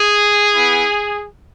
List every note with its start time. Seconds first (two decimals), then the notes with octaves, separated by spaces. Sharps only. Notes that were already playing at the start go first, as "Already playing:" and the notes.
Already playing: G#4
0.54 B3 E4